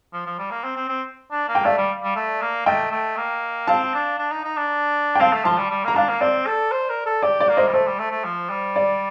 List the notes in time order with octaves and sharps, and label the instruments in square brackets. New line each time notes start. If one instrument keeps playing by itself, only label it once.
[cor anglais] F3
F3
G3
A#3
C4
C4
C4
D4
A#3
[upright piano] G5
[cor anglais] A3 [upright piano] D5 F5
[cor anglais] G3
G3
A3
A#3
[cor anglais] A3 [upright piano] D#5 G5
[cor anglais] A3
A#3
[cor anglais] C4 [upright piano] F5 A5
[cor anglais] D4
D4
D#4
D#4
D4
[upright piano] G5
[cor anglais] C4 [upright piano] F5 A5
[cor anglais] A3
[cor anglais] F3 [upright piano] A5 C6
[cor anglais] G3
G3
[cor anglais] A#3 [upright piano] A#5
[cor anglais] D4 [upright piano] F5 A5
[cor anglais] A#3
[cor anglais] C4 [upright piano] D5
[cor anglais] A4
C5
A#4
A4
[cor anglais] G4 [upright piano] D5
[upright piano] D5
[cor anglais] A#3
[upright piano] C5 D#5
[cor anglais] G3
[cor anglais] A3 [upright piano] C5
[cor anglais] G3
A3
A3
F3
G3
[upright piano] D5